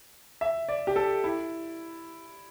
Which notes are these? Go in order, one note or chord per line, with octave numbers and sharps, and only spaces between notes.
E5
D5
G4
A4
E4